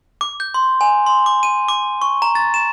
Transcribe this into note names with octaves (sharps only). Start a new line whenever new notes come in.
D6
G6
C6
G#5
C6
D6
D#7
D6
C#6
A#5
A6
E7